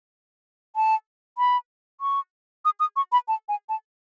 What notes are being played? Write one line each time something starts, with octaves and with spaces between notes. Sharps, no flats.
A5
B5
C#6
D#6
D#6
C#6
B5
A5
G#5
A5